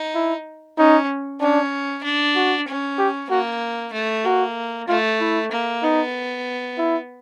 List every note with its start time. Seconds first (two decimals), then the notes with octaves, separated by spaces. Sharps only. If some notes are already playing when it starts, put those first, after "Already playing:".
Already playing: D#4
0.15 E4
0.78 C#4 D#4
1.41 C#4 D4
2.04 D4
2.36 F#4
2.68 C#4
2.99 G4
3.30 A#3 F#4
3.93 A3
4.25 A#3 F#4
4.88 A3 F4
5.20 E4
5.52 A#3
5.83 B3 D#4
6.78 E4